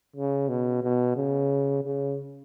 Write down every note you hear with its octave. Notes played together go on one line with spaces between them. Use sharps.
C#3
B2
B2
C#3
C#3